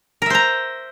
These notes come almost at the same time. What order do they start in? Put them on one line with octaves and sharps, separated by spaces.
A#4 E5 C5 A#5